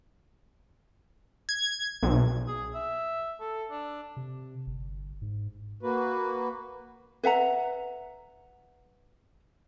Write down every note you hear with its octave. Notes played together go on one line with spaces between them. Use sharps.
G#6
B1
G#4
E5
A4
D4
C3
G1
G#2
A#3 F#4 B4
B4 E5 F#5 A#5